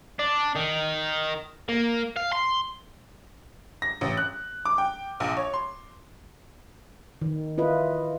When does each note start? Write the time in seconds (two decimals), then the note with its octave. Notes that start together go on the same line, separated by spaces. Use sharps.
0.19 D4
0.56 D#3
1.69 A#3
2.16 F5
2.33 C6
3.82 A#6
4.01 A1
4.17 F#6
4.65 D6
4.78 G5
5.20 A#1
5.37 C#5
5.54 C6
7.21 D#3
7.58 E4 F4 B4 D#5